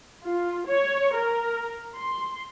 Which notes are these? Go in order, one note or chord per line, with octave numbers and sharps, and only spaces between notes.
F4
C#5
A#4
C6